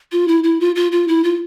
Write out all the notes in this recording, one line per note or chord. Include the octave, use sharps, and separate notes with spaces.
F4
E4
E4
F4
F4
F4
E4
F4